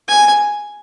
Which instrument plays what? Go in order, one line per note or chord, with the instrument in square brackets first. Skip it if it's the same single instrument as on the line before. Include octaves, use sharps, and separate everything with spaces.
[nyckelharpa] G#5